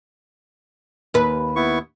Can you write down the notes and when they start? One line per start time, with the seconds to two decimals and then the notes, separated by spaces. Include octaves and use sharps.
1.14 D#2 B4
1.56 B3 E4 C#6